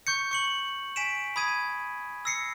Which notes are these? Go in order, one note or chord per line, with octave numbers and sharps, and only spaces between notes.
C#6 G6 C#7
C#6 C#7 F#7
G#5 B6 D7 E7
B5 D#6 G#6 D#7
E6 A#6 C7 C#7